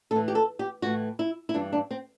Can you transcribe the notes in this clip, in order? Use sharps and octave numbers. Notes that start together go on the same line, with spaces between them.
A2 E3 A4
G4
A4
G4
A2 E3 F#4
E4
E4
G2 E3 D4
D4
C4